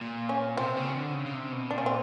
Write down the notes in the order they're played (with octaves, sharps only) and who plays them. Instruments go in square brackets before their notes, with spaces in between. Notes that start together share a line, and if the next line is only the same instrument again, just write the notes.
[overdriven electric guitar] A#2
[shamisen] C#4
[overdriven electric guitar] C3 [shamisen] C4
[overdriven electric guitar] C#3
D3
C#3
C#3
C3
B2
[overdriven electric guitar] A#2 [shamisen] D4
[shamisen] C#4
C4